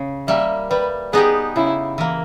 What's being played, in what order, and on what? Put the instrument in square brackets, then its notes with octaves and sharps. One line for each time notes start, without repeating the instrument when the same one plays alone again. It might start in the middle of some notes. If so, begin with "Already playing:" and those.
Already playing: [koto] C#3
[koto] G3 A#3 [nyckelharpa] E5
[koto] G3 [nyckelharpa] B4
[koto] B3 D#4 G4 [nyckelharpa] G#4
[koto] C#3 [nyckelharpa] E4
[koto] E3 A#3